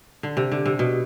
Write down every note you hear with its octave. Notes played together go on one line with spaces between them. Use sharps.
D3
C3
D3
C3
B2